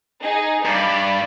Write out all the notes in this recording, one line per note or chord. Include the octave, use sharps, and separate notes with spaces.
D#4 G#4
G2 D5 B5